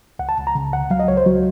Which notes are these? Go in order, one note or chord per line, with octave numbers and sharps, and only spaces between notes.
C#2 F#5
A5
C#2
A#5
C#3
C#2 F#5
F#3 F5
D#5
C#2 C#5
C5
F#3 F#4